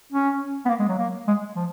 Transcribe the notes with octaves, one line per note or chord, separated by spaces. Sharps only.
C#4
B3
A#3
G#3
F#3
A#3
G#3
F3